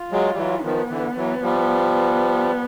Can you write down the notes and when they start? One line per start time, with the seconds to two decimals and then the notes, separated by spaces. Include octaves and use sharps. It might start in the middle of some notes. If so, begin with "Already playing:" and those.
Already playing: F4
0.12 F#3 G#3
0.34 G3
0.37 E3 F#3
0.64 D#3 F3 B3
0.89 D3 E3
1.17 E3 F#3
1.42 F3 G3